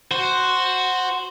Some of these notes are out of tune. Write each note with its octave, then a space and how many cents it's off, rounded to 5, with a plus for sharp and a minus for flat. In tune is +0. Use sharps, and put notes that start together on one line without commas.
F#4 +0 C5 +0